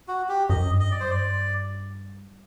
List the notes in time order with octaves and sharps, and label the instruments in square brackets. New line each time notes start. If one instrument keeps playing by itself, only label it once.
[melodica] F#4
G4
[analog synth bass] F#2 [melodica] D#5
[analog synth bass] G2
[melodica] D#5
[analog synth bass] F#2 [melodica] D5
[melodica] C5
[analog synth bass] G2 [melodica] D5